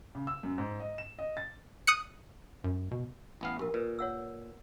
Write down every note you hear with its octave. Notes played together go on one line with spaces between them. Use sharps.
C#3
E6
F#2
G#2
D#5
E7
D#5
A6
D#6 F#6 C#7
F#2
B2
A1 B3 F5
A#1 G4 A#4
A#2 B4
C#5 F#5 E6